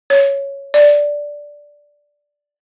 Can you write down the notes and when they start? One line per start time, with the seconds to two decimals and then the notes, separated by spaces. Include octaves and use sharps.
0.10 C#5
0.74 D5